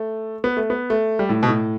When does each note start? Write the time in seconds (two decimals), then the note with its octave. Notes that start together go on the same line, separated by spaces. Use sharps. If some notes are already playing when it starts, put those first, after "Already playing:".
Already playing: A3
0.44 B3
0.57 A3
0.70 B3
0.90 A3
1.19 G3
1.29 A2
1.43 B2
1.48 A2